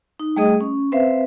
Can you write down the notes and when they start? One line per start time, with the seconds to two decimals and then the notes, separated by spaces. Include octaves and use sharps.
0.20 D#4
0.36 G3 A3 G#4 D#5 D#6
0.61 C#4
0.92 C4 B4 C5 E5 F5